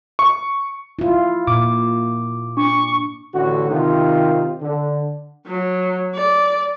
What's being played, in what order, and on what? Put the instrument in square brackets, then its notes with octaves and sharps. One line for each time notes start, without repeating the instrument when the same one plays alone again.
[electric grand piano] C#6
[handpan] E4 F4
[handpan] A#2 [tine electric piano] D6
[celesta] D4 [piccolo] C#6
[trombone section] A1 D3 F#4
C3 D#3 D#4 F4 G4
D3
[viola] F#3
D5